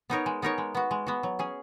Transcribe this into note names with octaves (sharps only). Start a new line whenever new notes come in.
B3 D#4 A#4 C#5
G#3
B3 D#4 A#4 C#5
G#3
B3 F#4
G#3
B3 F#4
F#3
C#4 G#4